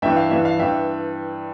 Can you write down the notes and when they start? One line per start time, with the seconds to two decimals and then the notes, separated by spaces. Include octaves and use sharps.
0.02 G2 E3 E5 G5
0.17 F5
0.31 G2 E3 E5
0.45 F5
0.59 G2 E3 E5 G5